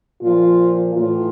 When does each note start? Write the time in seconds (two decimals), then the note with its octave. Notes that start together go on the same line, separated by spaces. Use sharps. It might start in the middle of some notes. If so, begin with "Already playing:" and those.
0.23 A#2 F3 F4
0.94 A2 E3 F4